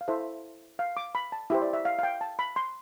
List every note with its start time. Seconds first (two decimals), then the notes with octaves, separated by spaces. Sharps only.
0.01 F5
0.08 E4 A4 C5 E5
0.79 F5
0.97 D6
1.15 B5
1.32 A5
1.50 E4 G4 C5 E5
1.62 D5
1.73 E5
1.85 F5
1.99 F5
2.03 G5
2.21 A5
2.39 B5
2.56 C6